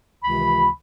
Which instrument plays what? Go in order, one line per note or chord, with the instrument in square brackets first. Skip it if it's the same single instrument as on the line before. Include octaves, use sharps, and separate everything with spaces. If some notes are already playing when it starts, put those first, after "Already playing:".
[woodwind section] C#2 C3 D#3 E3 B5